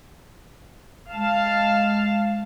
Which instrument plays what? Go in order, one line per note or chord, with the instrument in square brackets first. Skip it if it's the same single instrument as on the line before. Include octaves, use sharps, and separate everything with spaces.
[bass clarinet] G#3 [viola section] F5 A5